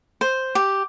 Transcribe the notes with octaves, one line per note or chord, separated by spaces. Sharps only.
C5
G4